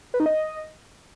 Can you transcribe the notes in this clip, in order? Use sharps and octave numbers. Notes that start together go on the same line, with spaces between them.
B4
D#4
D#5